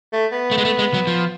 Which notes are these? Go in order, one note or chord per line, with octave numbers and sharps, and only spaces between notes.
A3
B3
A3
G#3
A3
G#3
F#3
F3